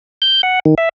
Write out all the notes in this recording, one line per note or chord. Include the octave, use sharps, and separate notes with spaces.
G6
F#5
D#3
E5